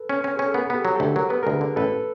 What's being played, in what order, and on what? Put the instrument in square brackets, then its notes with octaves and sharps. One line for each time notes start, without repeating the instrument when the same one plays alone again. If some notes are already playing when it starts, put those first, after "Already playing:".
Already playing: [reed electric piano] A4 B4
[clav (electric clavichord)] C#4
C#4
[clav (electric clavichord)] C#4 [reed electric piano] G#4
[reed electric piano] A4
[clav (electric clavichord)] B3 [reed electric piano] G#4 A#4
[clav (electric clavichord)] B3 [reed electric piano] G4 A4
[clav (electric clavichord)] F#3
[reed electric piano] G4 A4
[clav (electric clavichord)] D2
[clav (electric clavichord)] F#3 [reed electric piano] A#4
[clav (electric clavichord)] B3 [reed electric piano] B4
[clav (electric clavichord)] D2 [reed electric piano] G#4 A#4
[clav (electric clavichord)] D3
[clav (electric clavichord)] A1 [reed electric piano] A4 B4